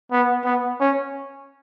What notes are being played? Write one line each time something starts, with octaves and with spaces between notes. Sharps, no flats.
B3
B3
C#4